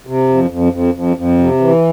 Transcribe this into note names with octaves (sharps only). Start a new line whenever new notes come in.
C3
F2
F2
F2
F2
F2
C3
E3